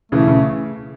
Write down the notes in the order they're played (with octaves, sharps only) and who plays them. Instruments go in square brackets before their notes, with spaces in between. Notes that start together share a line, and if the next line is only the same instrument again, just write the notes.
[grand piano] C#3 E3 [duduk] A3
[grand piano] C#3